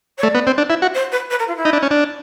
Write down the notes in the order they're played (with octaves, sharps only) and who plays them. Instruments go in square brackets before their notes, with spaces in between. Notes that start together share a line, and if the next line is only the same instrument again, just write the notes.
[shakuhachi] C#5
[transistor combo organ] A3 [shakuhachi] D5
[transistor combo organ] B3
C4
D4
E4
F#4
[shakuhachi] C5
B4
B4
A#4
F4
E4
[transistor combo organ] D#4
D4
C#4
D4